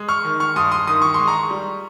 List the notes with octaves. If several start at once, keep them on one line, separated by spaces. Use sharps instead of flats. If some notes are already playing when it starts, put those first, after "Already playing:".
Already playing: G#3
C#6 F6
D#3
C#6 F6
G2 C6 D#6
C6 D#6
D#3 D#6
C#6
G#3 C6
A#5 C#6
G3